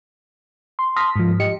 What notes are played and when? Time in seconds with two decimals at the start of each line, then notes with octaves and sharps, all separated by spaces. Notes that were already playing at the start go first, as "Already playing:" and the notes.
0.79 C6
0.96 A5 C6 D#6 F6 A#6 B6
1.16 G#2 F3
1.40 G4 D#5 C#7